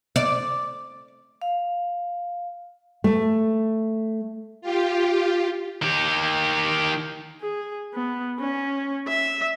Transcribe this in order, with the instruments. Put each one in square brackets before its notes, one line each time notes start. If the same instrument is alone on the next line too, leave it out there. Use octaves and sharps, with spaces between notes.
[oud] D5
[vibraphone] F5
[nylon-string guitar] A3
[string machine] F4 G4
[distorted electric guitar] D#3 G4
[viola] G#4
B3
C#4
E5